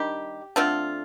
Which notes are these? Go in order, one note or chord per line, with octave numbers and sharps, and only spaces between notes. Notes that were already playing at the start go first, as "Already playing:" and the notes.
Already playing: D#3 G3 D4 G4
D3 A3 C4 F4